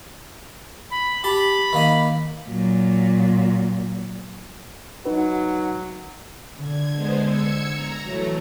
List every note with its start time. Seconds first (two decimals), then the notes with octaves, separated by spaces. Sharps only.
0.91 B5
1.24 G4 A5 B5
1.73 D#3 A#3 D#5
2.48 A#2 F#3
5.06 F#3 D#4 B4
6.61 D3 G#6
6.94 G#3 B3 C5
7.26 E6 G#6 C#7
7.72 A#5
8.05 E3 F#3 A3